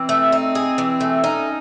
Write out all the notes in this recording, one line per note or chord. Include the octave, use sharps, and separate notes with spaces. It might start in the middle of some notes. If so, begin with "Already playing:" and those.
Already playing: E3 C4
A3
D#4
G#4
E3
A3
C#4 D#4